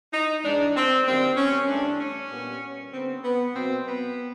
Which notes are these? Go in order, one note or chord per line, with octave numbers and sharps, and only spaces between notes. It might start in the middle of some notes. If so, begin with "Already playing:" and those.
D#4
G#2 E3 G#3 D4
C4
F#2 D#3 G3 A#3 C4
C#4
G2 E3 A3 D4
C#4
A#2 G3 B3
D3 G3 B3 C4
B3
B2 F#3 A#3 C4
B3